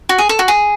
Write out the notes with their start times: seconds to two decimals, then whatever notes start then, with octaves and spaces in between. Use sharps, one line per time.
0.09 F#4
0.18 G#4
0.29 A4
0.39 F#4
0.48 G#4